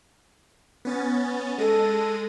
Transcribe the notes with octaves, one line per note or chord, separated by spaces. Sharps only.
B3 C#4 A6
G#3 A4 A#6 D#7